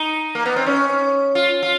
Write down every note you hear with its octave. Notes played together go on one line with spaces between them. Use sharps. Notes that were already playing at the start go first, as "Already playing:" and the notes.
Already playing: D#4
A#3
B3
C4
C#4
F4
F4